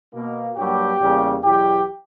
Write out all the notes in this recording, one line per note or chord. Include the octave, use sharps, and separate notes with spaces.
B2 A#3
G2 F#3 A#3 G4
E2 C#3 G3 A#3
E2 B2 F#3 G4